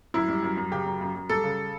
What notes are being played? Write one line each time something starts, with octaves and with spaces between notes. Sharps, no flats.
F#2 E4
G3
F#2
F#2
C#3 G4
F#2
F#2
F#2
G3 A4
C#3